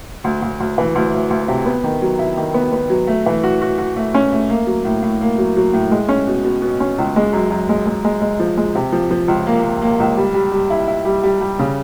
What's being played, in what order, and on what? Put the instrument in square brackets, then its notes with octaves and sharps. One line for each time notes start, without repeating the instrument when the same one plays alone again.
[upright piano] D2
D2
D2
E3
D2
D2
D2
C3
B3
D#3
F#3
E4
D#3
B3
B3
F#3
A3
E3
F#4
F#4
F#4
A3
C#4
A3
A#3
F#3
A2
A2
A#3
F#3
F#3
A2
G#3
C#4
B2
B2
B2
C#4
C#2
G#3
F#2
F#2
G#3
G#3
G#3
G#3
F3
G#3
C3
F3
F3
C#2
A#3
A#3
A#3
C#2
G3
G3
G3
E4
E4
G3
G3
G3
C#3